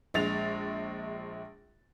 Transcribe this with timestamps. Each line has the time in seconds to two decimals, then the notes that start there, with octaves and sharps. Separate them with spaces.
0.14 A#1 G#3 A6 F7